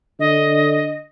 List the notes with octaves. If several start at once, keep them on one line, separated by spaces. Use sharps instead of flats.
D3 D#5